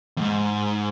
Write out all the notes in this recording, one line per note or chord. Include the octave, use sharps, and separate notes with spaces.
E2 G#2